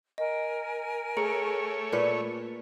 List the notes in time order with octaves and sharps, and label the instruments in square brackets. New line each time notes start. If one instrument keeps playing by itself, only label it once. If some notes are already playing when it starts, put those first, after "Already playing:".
[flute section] A#4 G#5 [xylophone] D#5
[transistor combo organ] A3 C#5 [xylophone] G#4 A#5 C#7
[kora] A#2 B4